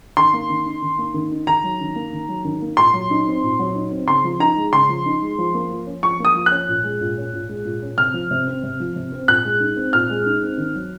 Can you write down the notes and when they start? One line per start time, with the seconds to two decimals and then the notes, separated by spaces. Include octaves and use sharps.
0.17 D#3 C6
0.33 A#3
0.50 D#3
0.65 D#4
0.82 D#3
0.98 A#3
1.14 D#3
1.31 D#4
1.47 D#3 A#5
1.64 F#3
1.80 D#3
1.96 A#3
2.12 D#3
2.29 F#3
2.45 D#3
2.62 A#3
2.77 A#2 C6
2.93 F#3
3.10 D#4
3.27 C4
3.43 A#2
3.59 F#3
3.75 D#4
3.91 C4
4.07 C#3 C6
4.24 F3
4.40 D#4 A#5
4.57 G#3
4.73 C#3 C6
4.89 F3
5.06 D#4
5.22 G#3
5.38 F3
5.54 A#3
5.71 F3
5.86 C#4
6.03 F3 C#6
6.20 A#3 D#6
6.35 F3
6.46 C#4 F#6
6.69 A#2
6.84 G#3
7.01 A#2
7.17 C#4
7.33 A#2
7.49 G#3
7.65 A#2
7.82 C#4
7.98 C3 F6
8.14 F3
8.31 C3
8.47 C4
8.63 C3
8.80 F3
8.96 C3
9.12 C4
9.28 A#2 F#6
9.45 G#3
9.60 D#4
9.76 C4
9.93 A#2 F6
10.10 G#3
10.26 D#4
10.43 C4
10.58 D#3
10.75 F#3